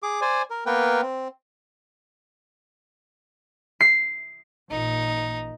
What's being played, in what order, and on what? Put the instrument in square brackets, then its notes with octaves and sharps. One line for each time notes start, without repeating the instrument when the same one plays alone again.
[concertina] G#4 D6
C5 D5 G#5
A#4
A#3 B3 A#4 B4 G5
C4
[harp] C7
[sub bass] A1 [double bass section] A#2 [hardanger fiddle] D#4